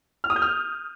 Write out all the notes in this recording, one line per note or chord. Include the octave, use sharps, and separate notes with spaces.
F6
D#6
G6
F6